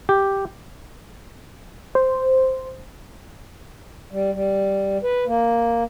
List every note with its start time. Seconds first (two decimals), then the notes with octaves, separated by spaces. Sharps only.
0.09 G4
1.95 C5
4.12 G3
4.33 G3
5.03 B4
5.27 A#3